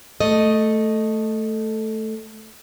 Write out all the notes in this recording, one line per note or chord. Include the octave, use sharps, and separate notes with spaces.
A3 D#5